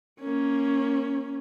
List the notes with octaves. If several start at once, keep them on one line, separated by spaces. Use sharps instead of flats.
A#3 C#4